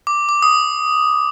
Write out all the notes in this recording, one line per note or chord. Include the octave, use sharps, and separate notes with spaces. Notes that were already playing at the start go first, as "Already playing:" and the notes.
D6
D6
D#6